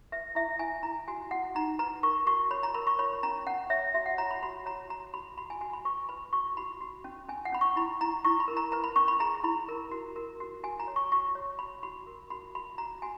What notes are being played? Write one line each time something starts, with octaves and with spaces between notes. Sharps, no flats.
B4 E5
E4 E5
E4 G#5
E4 A#5
F#4 G#5
F#4 F#5
D#4 A#5
B4 A#5
A#4 C#6
F#4 C#6
C#5 B5
A#5
A#4 B5
C#6
C#5 B5
C#4 A#5
C#4 F#5
C#5 E5
F#4 E5
F#5
C#5 A#5
B5
F#4 B5
C#5 A#5
F#4 A#5
F#4 B5
F#4 B5
G#5
F#4 G#5
B5
B4 C#6
B4 B5
F#4 C#6
F#4 B5
F#4
C#4
C#4 G#5
F#5
C#4 B5
C#6
E4 B5
E4 A#5
E4 C#6
B5
A#4
A#5
B4 A#5
B5
C#4 C#6
B5
G#4 A#5
E4 B5
A#4
F#4
A#4
F#4
F#4 G#5
A#5
C#5
C#6
F#4 C#6
C#5
F#4 B5
F#4 B5
A#4
F#4 B5
F#4 B5
F#4 A#5
F#4 G#5